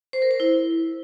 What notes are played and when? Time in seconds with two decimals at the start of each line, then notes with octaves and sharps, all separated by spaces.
0.13 C5
0.22 A#4
0.31 C5
0.40 E4